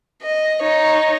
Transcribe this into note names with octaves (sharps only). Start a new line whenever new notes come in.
D#5
D#4 C#5